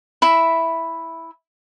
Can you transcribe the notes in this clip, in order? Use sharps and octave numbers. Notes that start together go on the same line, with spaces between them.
E4 E5